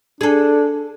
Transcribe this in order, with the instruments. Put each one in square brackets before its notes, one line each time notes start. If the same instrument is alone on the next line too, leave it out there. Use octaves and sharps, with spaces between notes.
[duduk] D4 [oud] G#4 A4